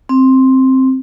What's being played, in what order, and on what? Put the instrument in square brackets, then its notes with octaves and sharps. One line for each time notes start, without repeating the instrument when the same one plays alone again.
[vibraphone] C4